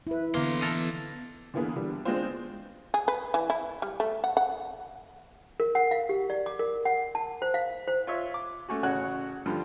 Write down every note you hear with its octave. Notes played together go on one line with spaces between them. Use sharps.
E4 B4
D3 E3 A#3 B3 B4 C6
A4 A#4 D#5
D3 E3 A#3 B3 G#4
D3 E3 G3
G#3 B3 C4 D4 F4 C5
G#4
B4
E3
E4
G3
A3
F#5
F#5
A#4
F#5
F5
G4
D5
D6
A#4
F#5
A5
C5
F5
C5
F4 C#5 E5
D6
A3 C#4 F#4
A1 C#3 F#4 C#5 F#5 F#6
G2 D3 F3 G3